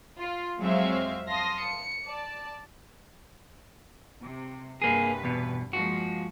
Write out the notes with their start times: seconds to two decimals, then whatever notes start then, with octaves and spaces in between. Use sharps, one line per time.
0.20 F4
0.61 F2 F#3 G#3 C4 E5 F5
1.28 F5 A5 C6 D#6 A#6
1.61 C#7
2.08 D5 A5
4.21 C3
4.82 G2 C3 A#3 G#4 B4
5.24 E2 B2
5.73 F3 G#3 A#3 F#4